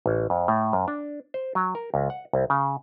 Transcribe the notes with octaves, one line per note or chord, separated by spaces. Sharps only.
A1
F2
A2
F#2
D4
C5
F#3
A#4
C#2
F#5
C2
C#3